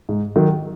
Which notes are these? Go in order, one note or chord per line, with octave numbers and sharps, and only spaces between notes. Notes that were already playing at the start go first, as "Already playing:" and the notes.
G#2
D#3 F#3